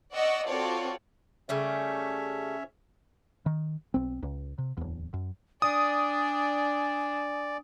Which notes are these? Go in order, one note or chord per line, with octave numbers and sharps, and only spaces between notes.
D5 D#5 F#5 C#6 E6
C4 F4 F#4 A4 C#5 D5
C#3 G3 A3 C#4 C#5 E5
D#3
B1 C4
C#2
C3
D1 E2
F#2
D4 D5 G#5 D#6